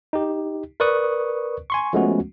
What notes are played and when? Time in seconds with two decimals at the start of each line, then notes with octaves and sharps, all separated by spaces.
0.13 D#4 G4
0.80 A#4 B4 D5 C#6 D#6 F#6
1.70 G#5 C6 C#6
1.93 F3 G#3 A3 B3 C#4 F#4